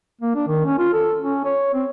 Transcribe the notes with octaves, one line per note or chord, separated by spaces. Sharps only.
A#3
D4
D#3
C#4
F4
A4
C#4
C#5
C4